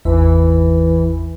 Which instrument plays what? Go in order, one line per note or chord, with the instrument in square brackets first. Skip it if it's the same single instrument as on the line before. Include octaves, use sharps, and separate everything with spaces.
[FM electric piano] G#1 E2 E5 [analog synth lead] E3